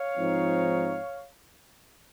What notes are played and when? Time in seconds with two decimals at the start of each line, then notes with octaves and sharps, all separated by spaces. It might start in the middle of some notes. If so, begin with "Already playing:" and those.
Already playing: C#5 F5
0.15 G#2 F3 C4 D#4